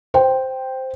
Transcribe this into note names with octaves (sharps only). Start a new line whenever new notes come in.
C5 G5